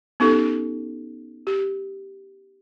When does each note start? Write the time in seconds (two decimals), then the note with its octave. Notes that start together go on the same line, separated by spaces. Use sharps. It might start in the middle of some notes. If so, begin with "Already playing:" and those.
0.20 B3 C#4 D#4 G4 A4
1.47 G4